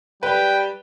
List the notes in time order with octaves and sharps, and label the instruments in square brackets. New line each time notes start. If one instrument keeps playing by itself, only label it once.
[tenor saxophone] G3 [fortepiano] B4 [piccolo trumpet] G5